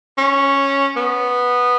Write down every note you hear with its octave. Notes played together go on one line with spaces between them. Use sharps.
C#4
B3